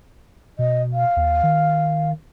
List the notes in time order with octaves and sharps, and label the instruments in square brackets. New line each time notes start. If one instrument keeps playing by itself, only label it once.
[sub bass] B2 [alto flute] D#5
[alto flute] F5
[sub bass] D#2
D#3